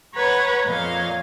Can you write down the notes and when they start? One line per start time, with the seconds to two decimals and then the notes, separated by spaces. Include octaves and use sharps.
0.14 B4 C#5 F#5 A#5
0.64 F2 A#2 C#5 D#5 F5